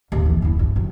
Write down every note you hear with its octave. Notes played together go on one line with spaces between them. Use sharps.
G#1 D#2
B1 E3
D#2 E4
G1 C2
C3 F#3